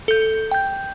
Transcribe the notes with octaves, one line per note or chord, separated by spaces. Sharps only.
A4 G6
G5 G6